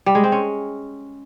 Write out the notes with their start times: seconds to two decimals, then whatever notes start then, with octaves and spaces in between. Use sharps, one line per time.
0.06 G3
0.15 G#3
0.24 C4
0.32 C#4